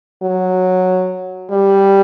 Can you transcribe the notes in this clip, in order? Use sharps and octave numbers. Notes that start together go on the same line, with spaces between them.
F#3
G3